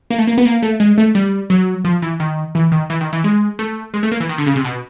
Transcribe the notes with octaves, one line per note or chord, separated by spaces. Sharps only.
A#3
A3
A#3
B3
A#3
A3
G#3
A3
G3
F#3
F3
E3
D#3
E3
D#3
E3
D#3
E3
G#3
A3
G#3
A3
A#3
E3
D#3
D3
C#3
C3
B2